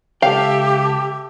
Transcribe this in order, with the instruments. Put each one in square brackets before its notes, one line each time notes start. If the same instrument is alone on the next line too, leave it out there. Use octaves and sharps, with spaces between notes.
[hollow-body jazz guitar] C#2 G5 [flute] G4 [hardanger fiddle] A4 E5 [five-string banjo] F5